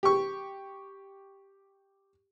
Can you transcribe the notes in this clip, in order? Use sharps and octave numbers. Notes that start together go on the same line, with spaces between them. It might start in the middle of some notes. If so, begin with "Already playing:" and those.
G4 C#6